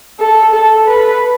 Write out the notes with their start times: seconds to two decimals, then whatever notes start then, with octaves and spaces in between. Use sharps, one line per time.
0.20 A4
0.53 A4
0.88 B4